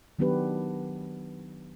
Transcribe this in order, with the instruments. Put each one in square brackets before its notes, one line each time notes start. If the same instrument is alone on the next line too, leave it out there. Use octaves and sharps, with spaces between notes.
[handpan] D#3 F#3 B3 D4 G4 B4